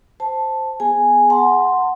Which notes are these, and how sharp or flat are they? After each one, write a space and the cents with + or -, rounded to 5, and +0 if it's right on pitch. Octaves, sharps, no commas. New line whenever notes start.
C5 +0 A5 +0
B3 +0 G#4 +0 G#5 -5
F#5 +0 A5 +35 C6 +0